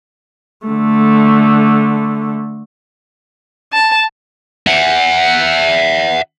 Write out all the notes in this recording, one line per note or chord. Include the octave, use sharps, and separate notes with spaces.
D3 A3
A5
E5 F#5